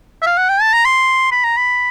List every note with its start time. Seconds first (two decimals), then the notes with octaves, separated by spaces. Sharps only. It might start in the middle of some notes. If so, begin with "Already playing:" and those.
0.22 E5
0.27 F5
0.38 F#5
0.49 G5
0.61 A5
0.73 A#5
0.85 C6
1.31 B5
1.44 A#5
1.57 B5